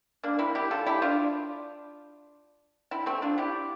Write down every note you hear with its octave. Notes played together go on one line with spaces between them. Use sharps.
A#3 D4
C4 E4
E4 G4
F4 A4
E4 G4
D4 F4
C4 E4
A3 C4
D4 F4
E4 G4